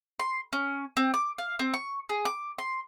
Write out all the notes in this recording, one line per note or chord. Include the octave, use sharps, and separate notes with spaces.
C6
C#4
C4
D6
F5
C4
C#6
G#4
D6
C6